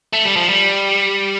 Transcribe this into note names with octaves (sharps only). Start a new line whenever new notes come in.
A3
G3
F3
G3